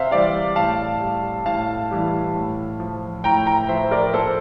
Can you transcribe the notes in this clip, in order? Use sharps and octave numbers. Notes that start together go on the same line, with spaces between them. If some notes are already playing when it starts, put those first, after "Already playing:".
Already playing: C3 C5 E5 F5
E3 G3 D5 F5
A2 F5 A5
G3
A2 F5 A5
E3 G3
A2
F3
A2 G5 A#5
G5 A#5
F3 C5 E5
A#4 D5
A#2 A4 C5